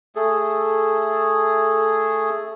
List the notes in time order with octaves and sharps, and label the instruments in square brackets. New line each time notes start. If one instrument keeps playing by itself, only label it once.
[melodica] A3 G#4 A4